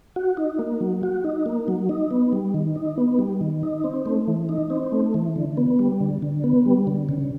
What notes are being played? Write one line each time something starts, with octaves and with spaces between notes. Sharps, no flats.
F#4
D#4
A#3
F#3
F#4
D#4
A#3
F#3
D#4
B3
G3
D#3
D#4
B3
G3
D#3
D#4
C4
A3
E3
D#4
C4
A3
E3
D3
B3
G3
D3
D3
B3
G3
D3
C#3